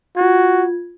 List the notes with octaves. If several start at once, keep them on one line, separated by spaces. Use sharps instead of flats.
F4 F#4 G#6